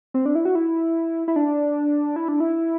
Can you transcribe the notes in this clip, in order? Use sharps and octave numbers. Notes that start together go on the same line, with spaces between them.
C4
D4
E4
F#4
E4
E4
D4
E4
D4
E4